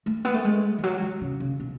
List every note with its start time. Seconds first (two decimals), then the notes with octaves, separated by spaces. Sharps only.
0.06 A3
0.25 B3
0.34 A3
0.44 G#3
0.78 E3
0.83 F#3
1.02 E3
1.21 C#3
1.40 C#3
1.60 B2